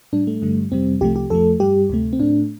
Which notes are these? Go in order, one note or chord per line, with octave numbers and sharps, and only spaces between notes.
A2 G3 D4
A3
G2 D3 G3
F2 C3 G3 C4
C2 C3 F3 A3 G4
G4
F2 F3 A3 A4
G2 G3 G4
D2 C3 A3
C4
A2 A3 D4